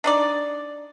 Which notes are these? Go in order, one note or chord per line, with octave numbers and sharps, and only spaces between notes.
D4 D#4 D5